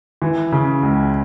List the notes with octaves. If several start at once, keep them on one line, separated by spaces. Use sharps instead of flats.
E3
C#3
C#2